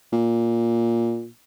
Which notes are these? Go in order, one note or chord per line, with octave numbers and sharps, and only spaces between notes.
A#2